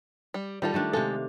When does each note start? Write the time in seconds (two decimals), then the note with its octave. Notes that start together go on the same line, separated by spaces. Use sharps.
0.34 G3
0.62 D#3 G3 F4 A4
0.74 D#3 A3 D4
0.93 C3 G#3 A4 F5